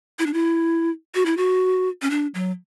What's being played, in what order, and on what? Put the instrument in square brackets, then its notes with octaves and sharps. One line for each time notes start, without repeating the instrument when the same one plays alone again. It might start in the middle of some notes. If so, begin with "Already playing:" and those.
[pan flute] E4
D4
E4
F#4
E4
F#4
C#4
D4
F#3